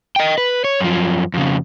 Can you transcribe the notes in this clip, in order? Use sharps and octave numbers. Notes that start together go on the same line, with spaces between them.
D#5 G5
B4
C#5
F#2 F3
F2 C#3